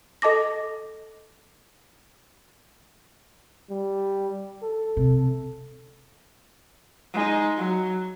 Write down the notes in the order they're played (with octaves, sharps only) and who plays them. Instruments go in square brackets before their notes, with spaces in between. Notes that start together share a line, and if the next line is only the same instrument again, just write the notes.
[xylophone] A4 D#5 A5 D6 A#6
[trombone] G3
A4
[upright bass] C3
[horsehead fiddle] G#3 D#4
F#3